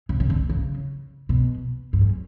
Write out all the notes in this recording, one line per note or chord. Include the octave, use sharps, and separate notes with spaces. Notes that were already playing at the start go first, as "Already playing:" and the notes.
C#3
C#3
D3
C#3
B2
G2
F#2